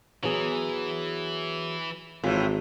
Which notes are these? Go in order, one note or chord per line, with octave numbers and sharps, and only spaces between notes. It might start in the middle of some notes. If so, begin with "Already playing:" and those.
E3 F#3 B3 G#4
G#1 A2 E3 F4